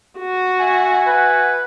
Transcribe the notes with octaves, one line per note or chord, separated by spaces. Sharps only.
F#4
E5 F#5 G#5
B4